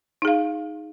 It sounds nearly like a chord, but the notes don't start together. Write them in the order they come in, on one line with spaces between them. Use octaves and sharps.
D#4 G#4 F5